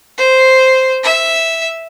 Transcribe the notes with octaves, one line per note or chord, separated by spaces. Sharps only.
C5
E5